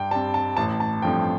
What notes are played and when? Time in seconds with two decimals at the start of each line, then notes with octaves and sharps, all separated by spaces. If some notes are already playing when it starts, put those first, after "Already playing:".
Already playing: G2 G5
0.11 G3 A5
0.15 C4
0.34 A5
0.57 A1 A5
0.80 A5
1.02 G2 F3 A3 C4 G5